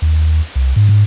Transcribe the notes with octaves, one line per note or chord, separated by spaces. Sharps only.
D#2
C2
G#2
G#2